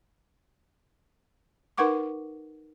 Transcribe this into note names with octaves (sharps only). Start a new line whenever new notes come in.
D#4 A#4 B4 F#5 C#6 D6